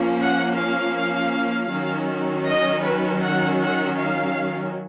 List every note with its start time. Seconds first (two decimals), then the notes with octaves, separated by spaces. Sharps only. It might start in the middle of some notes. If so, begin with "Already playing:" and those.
Already playing: F3 A#3 C#4
0.19 F#5
0.57 F5
1.71 D#3 F#3 C#4
2.47 D#5
2.84 B4
3.22 F#5
3.60 F#5
3.98 F5